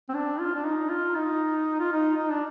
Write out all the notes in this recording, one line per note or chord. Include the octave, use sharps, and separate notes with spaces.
C4
D4
F4
D4
D#4
F4
D#4
F4
D#4
D#4
D4